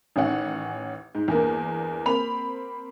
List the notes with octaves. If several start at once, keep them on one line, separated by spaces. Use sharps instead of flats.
A1 D#3 C#4 F#5
G#2
E2 G2 A#3
A#3 C4 B5 F7